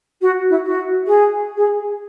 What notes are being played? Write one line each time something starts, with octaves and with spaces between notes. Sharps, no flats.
F#4
E4
F#4
G#4
G#4